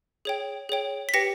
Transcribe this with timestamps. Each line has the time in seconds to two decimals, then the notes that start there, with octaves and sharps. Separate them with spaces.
0.25 G#4 C#5 G5
0.69 G#4 C#5 G5
1.09 B6
1.14 G4 B4 G5 A#6 C#7